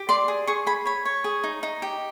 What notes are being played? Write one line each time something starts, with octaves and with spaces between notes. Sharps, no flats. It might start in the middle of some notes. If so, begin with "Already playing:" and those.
Already playing: G4
D5 C6
G#4
G#4 C#6
G#4 B5
C#5 B5
C#5
G#4
D#4
D#4
G4